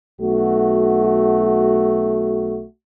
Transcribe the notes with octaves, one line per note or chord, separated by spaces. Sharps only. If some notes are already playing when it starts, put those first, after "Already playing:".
B1 A3 F#4